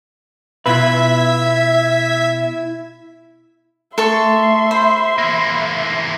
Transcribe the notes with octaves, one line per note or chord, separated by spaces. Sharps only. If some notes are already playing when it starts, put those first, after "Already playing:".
B2 E4 F4 B4 E5 G#6 B6
A3 A4 E5 C6 C#6
C5 B5
E3 A#3